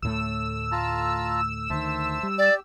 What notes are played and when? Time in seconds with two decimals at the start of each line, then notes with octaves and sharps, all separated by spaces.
0.02 D2 A2 A3 E6
0.72 F4 A5 A#5
1.70 D2 D#3 C5 E5 A5
2.23 G3
2.38 G4 D5